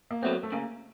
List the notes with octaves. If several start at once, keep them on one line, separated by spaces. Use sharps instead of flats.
A#3
F#3 A3 B3 C4
A3
C#3 A#3